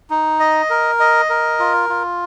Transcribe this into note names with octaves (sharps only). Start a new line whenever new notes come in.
D#4
D#5
A#4
D#5
A#4
F4
F4